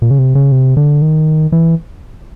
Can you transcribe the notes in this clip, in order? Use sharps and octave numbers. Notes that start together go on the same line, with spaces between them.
A#2
C#3
C3
C#3
C3
D3
D#3
E3